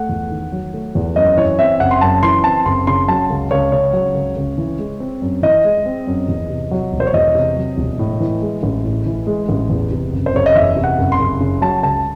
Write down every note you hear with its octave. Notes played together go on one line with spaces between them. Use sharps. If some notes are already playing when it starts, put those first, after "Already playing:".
Already playing: A3 F#5
E2
D#3
F#3
A3
E2
F#2 D#5
E3 C#5
C4 E5
F#1 F#5
C6
F#2 A5
E3 C6
C4 A5
F#1 C6
C#3 C6
F#3 A5
C#2
C#2 C#5
C#3 C#5
F#3
C#2
C#2
E3
G#3
C4
F#2
E3 D#5
G#3
C4
F#2
E2
C3
F#3
E1
C5
C#5
E2 D#5
C3
F#3
E1
A2
E3
G#3
A1
A2
E3
G#3
A1
E2
C3
F#1
C5
F#1 C#5
D#5
E2 E5
C3
F#5
F#1
C6
F#1
C#3
F#3 A5
C#2 A5